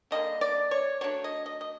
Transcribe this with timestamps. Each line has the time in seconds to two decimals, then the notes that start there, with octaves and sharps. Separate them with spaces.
0.11 D3 G3 A#3 D4 D#5
0.41 D5
0.71 C#5
1.01 F#3 A3 D4 C#5
1.24 D#5
1.46 D#5
1.61 D#5